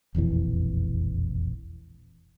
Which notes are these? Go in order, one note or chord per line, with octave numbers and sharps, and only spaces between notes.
E1 A#1 F2 E3